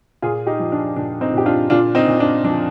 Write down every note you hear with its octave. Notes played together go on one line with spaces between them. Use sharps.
A#2 F4 G#4
D#4 G4
F3
D4
A#2 D4
C4 D#4
A#2 G4
D4 F4
A#2 D4 F4
C4 D#4
A#2
D4
F3 D4